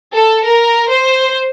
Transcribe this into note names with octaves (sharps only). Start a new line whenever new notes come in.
A4
A#4
C5